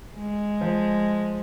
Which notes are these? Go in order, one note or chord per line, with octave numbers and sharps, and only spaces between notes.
G#3
F3